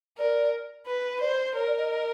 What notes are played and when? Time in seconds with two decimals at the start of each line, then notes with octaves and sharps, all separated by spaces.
0.18 A#4 D5
0.87 B4
1.20 C5 D5
1.54 A#4 C#5
1.67 D5
1.77 D#5